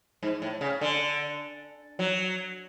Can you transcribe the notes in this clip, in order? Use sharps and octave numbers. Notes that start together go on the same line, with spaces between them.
G#2
A2
C#3
D3
F#3